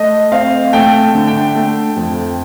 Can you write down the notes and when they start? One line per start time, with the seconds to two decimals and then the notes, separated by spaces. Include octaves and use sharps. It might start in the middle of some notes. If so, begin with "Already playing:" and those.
Already playing: A3 D#5
0.32 C4 F5
0.73 A3 G5
1.14 D3
1.28 G5
1.55 A3
1.96 F2